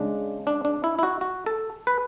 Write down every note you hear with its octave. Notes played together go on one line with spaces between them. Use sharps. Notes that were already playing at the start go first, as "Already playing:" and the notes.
Already playing: C#3 G#3 D4
D4
D4
E4
E4
F#4
F#4
A4
B4